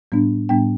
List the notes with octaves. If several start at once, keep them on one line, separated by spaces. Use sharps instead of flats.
A2 G3 B3 D4
A2 G3 B3 D4 G5